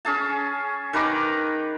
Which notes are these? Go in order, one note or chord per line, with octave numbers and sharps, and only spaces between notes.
C#4 G#4 A5
D#3 B4 A#5 D6